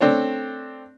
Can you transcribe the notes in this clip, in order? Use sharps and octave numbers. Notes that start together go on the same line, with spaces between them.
A3 C4 D4 C#5